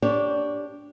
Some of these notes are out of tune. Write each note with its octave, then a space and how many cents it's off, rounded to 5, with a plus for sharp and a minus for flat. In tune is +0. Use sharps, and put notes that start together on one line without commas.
D4 -15 G4 +0 C#5 +0